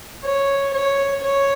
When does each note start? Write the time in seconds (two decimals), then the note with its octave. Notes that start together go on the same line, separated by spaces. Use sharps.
0.24 C#5
0.73 C#5
1.23 C#5